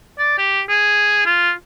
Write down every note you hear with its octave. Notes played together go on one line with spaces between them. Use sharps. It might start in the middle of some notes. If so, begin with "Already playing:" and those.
D5
G4
G#4
F4